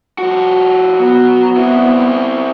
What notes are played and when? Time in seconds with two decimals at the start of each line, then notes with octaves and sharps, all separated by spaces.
0.18 F3 F#4
0.99 F#3 B3
1.57 C4 E4